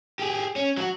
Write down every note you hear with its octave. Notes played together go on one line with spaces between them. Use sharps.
G4 G#4
C#4
F#3 F#4